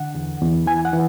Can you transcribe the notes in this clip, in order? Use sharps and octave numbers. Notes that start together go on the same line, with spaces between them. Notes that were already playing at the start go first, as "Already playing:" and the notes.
Already playing: D3 F#5
E2
E2
E3 G#5
F#5
E3